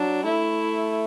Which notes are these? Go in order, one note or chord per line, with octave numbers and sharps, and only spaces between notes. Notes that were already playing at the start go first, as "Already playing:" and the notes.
Already playing: F#3 D4
A3 E4